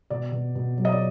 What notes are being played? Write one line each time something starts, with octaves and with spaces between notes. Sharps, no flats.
B2 D5
B2
B2
F#3
D#5
D5